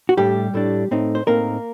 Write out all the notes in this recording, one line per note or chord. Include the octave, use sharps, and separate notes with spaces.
F#4
A2 G3 A3 D4 G4
A2 A3 D4
A2 A3 C4 D#4
C5
A2 A3 A#3 C4 D#4 A#4